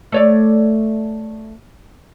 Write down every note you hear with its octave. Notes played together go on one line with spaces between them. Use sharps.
A3 C#5 D5